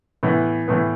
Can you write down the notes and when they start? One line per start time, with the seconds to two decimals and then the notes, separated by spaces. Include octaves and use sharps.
0.23 A2 E3 B3
0.67 A2 E3 B3